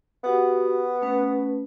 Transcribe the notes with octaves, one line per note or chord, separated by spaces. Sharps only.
B3 F#4 G4 F#5
A3 C#4 B4